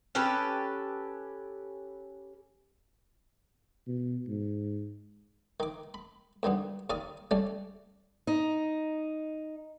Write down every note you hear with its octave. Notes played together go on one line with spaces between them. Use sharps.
C#4 G4 A4 B4
B2
G#2
D#3 D6
B5
D2 D#3 G3 B3
D#2 D#3 D5 F5 D#6
G3 A3 C#4 D5
D#4